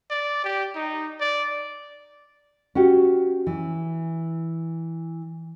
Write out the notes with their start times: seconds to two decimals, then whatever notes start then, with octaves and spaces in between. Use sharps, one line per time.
0.10 D5
0.45 G4
0.76 D#4
1.20 D5
2.75 C#4 F#4 G4
3.47 E3